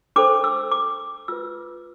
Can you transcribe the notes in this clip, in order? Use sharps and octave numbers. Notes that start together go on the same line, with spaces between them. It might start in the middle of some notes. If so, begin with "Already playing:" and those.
D4 A4 C5 D6
E6
D6
F4 B4 E6